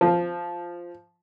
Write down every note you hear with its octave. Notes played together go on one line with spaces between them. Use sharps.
F3